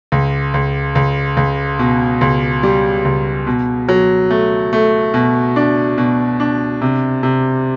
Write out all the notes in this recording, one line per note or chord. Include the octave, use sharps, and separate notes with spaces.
C#2
C#2
C#2
C#2
B2
C#2
G3
C#2
B2
F#3
A3
A3
B2
D4
B2
D4
C3
C3